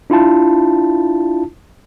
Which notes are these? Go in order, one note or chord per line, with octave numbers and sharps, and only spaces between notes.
D4 E4 F4 A5